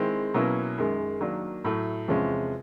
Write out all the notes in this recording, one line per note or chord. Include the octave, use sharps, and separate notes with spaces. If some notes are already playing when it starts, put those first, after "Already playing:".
Already playing: D#3 G#3 C4 E4
B2 F#3 A#3 C#4 E4
F#2 D#3 G#3
D#3 F#3 A#3 D4
A2 F#3 A3
E2 C3 F3 G#3 C#4